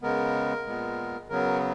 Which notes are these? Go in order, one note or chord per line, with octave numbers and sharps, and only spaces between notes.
C#3 G#3 B3 A#4
A#2 G#3 B3
C#3 F#3 B3 A#4